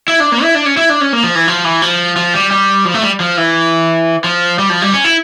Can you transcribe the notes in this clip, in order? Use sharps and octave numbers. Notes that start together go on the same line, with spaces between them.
E4
D4
A#3
E4
D4
C#4
E4
D4
C#4
A#3
F3
E3
F3
E3
F3
F3
G3
G3
F3
A3
G3
F3
E3
F3
G3
F3
G3
C#4
E4